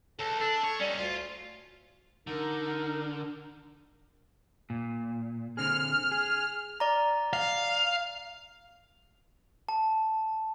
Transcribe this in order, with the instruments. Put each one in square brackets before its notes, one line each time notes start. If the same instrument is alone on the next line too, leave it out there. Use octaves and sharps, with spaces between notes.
[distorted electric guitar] C#2 [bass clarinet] A4
[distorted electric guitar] D4 [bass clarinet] A4
[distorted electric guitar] C#5
[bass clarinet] G3 [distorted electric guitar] C#4 D#4
[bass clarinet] D2 [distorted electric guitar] F4
[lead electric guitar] D3 [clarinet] D#4 [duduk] A#4
[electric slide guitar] A#2
[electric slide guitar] D3 C4 G#4 [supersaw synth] F6
[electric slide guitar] G#4
[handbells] D5 A#5
[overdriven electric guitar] F5
[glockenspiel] A5